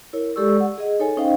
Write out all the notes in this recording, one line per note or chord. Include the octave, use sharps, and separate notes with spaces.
E4 A#4 C#5
G#3 G4 A4 D5 C#6 E6
F#5
G#4 D#5
D#4 A4 C#5 G#5
C#4 D#4 C5 D#5 F5 G5